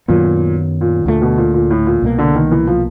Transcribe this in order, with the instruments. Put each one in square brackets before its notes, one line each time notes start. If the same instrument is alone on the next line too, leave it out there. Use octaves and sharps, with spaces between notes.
[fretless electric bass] F#2 D#3 F#3 B3 [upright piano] A#2
[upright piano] A#2
[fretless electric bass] D2 D3 F#3 A3 [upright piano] A#2
[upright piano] B2
A#2
A#2
A2
A#2
[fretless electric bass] C2 B2 G3 A#3
[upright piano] D3
D#3
E3
F3